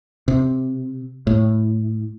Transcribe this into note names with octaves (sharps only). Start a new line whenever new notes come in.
C3
A2